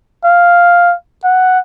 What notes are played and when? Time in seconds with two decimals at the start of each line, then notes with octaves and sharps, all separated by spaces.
0.24 F5
1.24 F#5